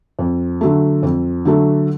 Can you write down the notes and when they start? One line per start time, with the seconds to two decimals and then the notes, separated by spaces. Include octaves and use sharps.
0.19 F2
0.61 D3 F#3 A3
1.03 F2
1.45 D3 F#3 A3